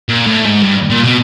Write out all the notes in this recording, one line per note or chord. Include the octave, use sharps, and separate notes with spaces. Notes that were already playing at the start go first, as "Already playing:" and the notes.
A#2
A2
G#2
G2
A#2
B2